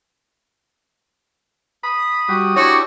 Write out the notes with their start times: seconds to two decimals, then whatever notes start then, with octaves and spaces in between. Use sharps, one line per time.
1.84 B5 D#6
2.29 G3 F#4
2.56 D4 E4 F#4 G4 C#5